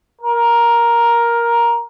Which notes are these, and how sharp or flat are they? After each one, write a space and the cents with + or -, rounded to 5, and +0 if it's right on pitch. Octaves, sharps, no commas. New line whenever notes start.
A#4 +10